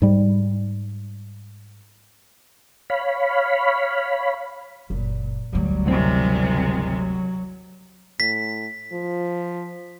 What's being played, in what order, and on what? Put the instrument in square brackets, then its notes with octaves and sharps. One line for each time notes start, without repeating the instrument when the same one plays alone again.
[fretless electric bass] G#2 G3
[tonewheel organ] C#5 F5 B5
[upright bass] F#1 [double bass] A#2
[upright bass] G1 D2 [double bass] F#3 G3
[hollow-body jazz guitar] C#2 A2 C4 [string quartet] C3 D#3 G#3
[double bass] F#3
[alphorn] A2 [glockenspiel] B6
[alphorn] F3